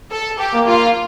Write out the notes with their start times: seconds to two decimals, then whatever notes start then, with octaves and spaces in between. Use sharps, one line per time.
0.12 A4
0.39 G4
0.53 A#3
0.67 F4